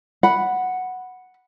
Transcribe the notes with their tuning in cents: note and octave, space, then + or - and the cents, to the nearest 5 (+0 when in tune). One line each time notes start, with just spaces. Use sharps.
F#5 +0 B5 +0